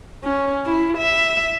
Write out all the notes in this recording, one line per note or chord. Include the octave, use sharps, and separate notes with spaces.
C#4
E4
E5